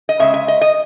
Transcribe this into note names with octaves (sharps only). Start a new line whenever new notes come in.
D#5
C#3 G#3 E5
E5
D#5
D#5